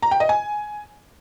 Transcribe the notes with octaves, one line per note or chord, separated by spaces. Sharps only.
A#5
G5
D#5
G#5